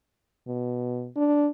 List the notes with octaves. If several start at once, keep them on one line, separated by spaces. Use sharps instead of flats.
B2
D4